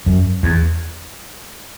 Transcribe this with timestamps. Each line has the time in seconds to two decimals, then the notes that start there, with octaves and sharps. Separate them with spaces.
0.06 F#2
0.43 E2